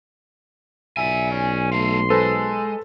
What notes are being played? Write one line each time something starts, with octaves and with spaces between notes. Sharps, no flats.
B1 D5 E5 G#5
C#4
A3 F5 C6
G#3 A4 B4 C5